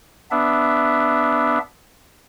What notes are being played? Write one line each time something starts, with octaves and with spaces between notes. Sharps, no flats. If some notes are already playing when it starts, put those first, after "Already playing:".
B3 D4 E5